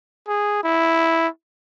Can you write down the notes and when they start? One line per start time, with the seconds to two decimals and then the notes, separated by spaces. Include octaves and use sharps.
0.28 G#4
0.64 E4